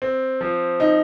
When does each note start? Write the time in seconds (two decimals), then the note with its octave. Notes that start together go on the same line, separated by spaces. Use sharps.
0.02 C4
0.41 F3
0.80 D#4